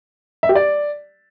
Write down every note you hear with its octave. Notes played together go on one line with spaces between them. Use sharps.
E5
G4
D5